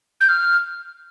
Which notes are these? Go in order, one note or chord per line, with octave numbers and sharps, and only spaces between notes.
G6
F6